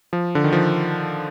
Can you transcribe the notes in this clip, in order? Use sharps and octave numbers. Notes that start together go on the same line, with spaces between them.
F3
D3
D#3
F3